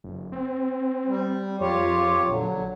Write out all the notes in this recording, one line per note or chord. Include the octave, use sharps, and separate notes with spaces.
F#1
C4
G3
F2 F4 G4 C#5
A#1 D3 F#3